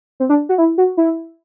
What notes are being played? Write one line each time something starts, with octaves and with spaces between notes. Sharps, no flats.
C4
D4
F#4
E4
F#4
E4